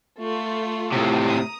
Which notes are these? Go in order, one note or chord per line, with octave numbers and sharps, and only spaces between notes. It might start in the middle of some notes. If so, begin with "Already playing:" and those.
A3 F4
A2 C3
A#5 D#6